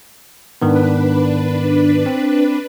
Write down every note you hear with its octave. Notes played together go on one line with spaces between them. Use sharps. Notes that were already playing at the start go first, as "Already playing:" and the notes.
G#2 D#3 B3 D4 B4
C4